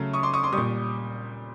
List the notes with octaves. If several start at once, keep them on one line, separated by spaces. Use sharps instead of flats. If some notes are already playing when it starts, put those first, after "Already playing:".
Already playing: C#3 F#3 A3
C#6 D#6
C6 D6
C#6 D#6
C6 D6
A#2 G3 C#6 D#6